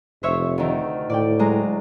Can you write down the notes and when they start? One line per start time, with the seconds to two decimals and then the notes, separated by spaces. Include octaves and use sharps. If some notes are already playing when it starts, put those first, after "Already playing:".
0.23 F1 C5 C#5 E5
0.58 D2 D#3
1.10 A2 D5 G5
1.39 F#2 G#3 A#5